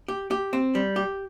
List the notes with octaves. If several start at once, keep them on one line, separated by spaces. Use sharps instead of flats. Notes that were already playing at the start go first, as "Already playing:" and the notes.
G4
G4
C4
G3
G4